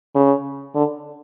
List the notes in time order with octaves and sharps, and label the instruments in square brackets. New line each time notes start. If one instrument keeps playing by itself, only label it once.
[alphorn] C#3
D3